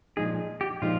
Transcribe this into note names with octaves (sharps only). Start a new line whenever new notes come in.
A#2 F3 G#3 D#4 G#4
G4
A#2 F3 G#3 D#4 F4